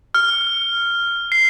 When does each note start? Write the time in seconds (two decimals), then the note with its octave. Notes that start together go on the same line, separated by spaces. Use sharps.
0.15 F6
1.32 C7